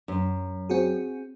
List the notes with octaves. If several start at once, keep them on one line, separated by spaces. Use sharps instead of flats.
F#2
C4 F#4 G#4